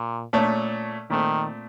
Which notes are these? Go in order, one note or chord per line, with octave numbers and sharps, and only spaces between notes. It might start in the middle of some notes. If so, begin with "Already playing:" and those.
Already playing: A#2
A#2 A3 C#4 A4 C#5
A#2 D#3 A3 C4